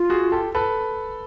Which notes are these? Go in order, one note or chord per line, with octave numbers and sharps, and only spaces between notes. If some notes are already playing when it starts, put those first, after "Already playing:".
Already playing: F4
F#4 G#4
G4 A4
A4 B4